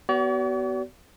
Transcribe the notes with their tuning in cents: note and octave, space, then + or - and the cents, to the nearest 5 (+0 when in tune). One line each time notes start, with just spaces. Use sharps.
B3 +0 F#4 +40 D5 -45